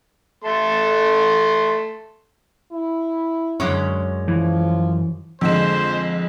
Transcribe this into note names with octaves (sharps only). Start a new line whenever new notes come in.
A3 A4 C6
E4
F#2 D3 G#3 C#4
E3 F3
F2 D3 G#3 C5 E6 E7